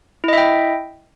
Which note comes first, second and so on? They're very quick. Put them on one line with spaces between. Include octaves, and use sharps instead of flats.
E4 D#5 E5 G5